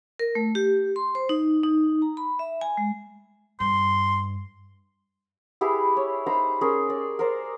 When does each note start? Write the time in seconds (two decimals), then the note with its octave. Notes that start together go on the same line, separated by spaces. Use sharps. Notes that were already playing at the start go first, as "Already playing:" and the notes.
0.19 A#4
0.35 A3
0.55 G4
0.96 C6
1.15 C5
1.29 D#4
1.64 D#4
2.02 A#5
2.17 B5
2.39 E5
2.61 G#5
2.77 G#3
3.60 G2 C6
5.61 E4 G4 G#4 B4
5.97 C#5
6.27 D#4 C5 A#5 B5
6.61 C#4 G#4 A#4
6.90 D5
7.19 A#4 C5 D5